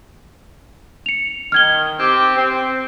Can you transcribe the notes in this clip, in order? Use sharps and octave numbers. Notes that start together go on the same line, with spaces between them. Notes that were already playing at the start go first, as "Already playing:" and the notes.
C#7 F7
D#3 F6 G#6 G7
C4 G4
C4